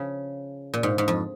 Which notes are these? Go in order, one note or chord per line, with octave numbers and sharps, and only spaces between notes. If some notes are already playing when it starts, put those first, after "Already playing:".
Already playing: C#3 F3
A#2
G#2
G#2
F2